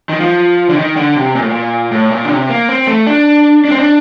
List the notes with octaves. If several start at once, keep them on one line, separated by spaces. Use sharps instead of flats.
D#3
F3
D3
D#3
D3
C3
A#2
A2
A#2
A2
A#2
D3
C3
A#3
C4
A3
D4
D4
C4
D4